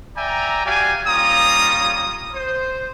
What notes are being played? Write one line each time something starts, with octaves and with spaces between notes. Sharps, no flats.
D5 E5 G5 G#5 A#5
F#4 G4 D5 F5 G#5
G3 A#3 C#4 F4 A#5 D#6
C5